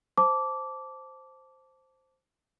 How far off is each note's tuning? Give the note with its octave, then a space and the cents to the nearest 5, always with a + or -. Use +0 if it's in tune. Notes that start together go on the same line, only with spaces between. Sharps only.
C5 +0 A5 +0 D6 -15